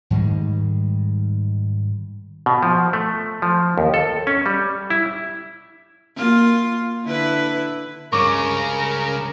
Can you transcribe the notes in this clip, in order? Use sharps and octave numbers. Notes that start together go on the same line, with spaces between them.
G#2 D#3 G3 G#3
B2
F3
A3
F3
D#2
A4
C#4
G3
E4
A#3 F4
D3 E4 B4
C#2 G2 C#3 A#4 C#6 D6